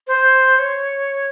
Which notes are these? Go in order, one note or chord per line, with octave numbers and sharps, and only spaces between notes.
C5
C#5